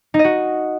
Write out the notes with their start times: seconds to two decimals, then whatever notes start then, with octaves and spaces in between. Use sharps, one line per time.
0.14 D#4
0.19 D#5
0.24 F#4